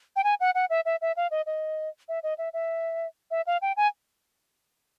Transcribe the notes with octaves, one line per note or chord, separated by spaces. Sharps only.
G5
G#5
F#5
F#5
E5
E5
E5
F5
D#5
D#5
E5
D#5
E5
E5
E5
F5
G5
G#5